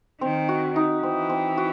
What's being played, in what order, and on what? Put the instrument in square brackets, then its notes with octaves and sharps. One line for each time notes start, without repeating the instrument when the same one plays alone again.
[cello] D#3 [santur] C4
[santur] F#4
D#4
[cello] E3 [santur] C4
[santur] C4
F#4